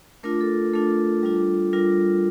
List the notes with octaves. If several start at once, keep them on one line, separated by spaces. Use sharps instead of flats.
A3 D4 F4 A#4
A4
A3 D4 F4 A4
G3 D4 F4
G3 D4 F4 A#4